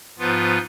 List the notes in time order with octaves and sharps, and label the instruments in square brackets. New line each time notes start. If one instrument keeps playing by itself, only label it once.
[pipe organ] G#2 F3 B3 F4 B4